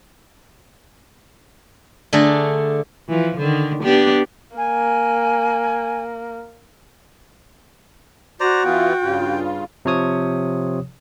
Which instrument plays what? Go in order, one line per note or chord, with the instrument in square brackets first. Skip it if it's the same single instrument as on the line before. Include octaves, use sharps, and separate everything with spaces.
[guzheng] D3 A3 D4 G#4 A#5
[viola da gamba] E3 F3
D3 D#3
B3 D4 G4
[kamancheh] A#3 [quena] G#5
[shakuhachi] F#4 [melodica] C5 D5 A#5
[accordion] E3 B3 F4 [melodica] G5
[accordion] G2 C#3 F4
[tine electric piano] C3 F3 C#5 D#6